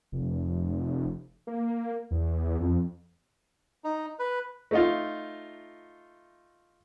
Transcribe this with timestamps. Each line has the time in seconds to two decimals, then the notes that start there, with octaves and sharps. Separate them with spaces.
0.12 F1
1.47 A#3
2.11 E2
2.60 F2
3.84 D#4
4.19 B4
4.71 A3 D#4 F4